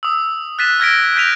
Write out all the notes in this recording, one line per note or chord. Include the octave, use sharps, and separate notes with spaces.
D#6 E6
F#6 A6 B6 D#7 E7
F6 G#6 A#6 B6 D7
G6 A#6 B6 D#7 F7